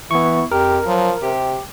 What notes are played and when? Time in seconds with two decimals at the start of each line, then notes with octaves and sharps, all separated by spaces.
0.11 E3 B3 E4 C#6
0.52 F2 G4 A#4
0.86 F3 F#3
1.22 C3 G4